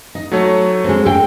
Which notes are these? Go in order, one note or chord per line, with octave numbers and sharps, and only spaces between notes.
D#4
F#3 A3 C#5
G#3 C4
A4 G5